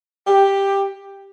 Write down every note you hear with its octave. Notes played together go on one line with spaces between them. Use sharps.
G4